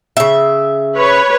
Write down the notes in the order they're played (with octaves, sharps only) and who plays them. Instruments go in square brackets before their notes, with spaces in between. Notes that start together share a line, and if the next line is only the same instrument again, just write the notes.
[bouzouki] C#3 E5
[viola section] B4 C#5